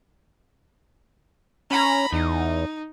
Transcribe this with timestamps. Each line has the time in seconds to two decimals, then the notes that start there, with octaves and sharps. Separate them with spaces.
1.71 C#4 A#5 B5
2.13 E2 D#4